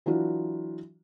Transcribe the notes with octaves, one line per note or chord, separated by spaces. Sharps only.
E3 F#3 D4 F4 F#4